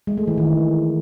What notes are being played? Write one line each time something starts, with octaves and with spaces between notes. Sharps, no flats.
G#3
A3
E3
D#3